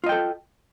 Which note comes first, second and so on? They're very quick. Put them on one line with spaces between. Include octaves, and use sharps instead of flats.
F4 D#5 G5 A4